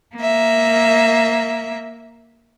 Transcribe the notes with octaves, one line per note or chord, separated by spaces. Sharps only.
A#3 E5